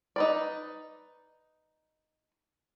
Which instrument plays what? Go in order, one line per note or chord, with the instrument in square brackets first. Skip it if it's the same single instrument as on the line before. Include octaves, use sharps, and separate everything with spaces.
[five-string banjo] D#4 B4 D5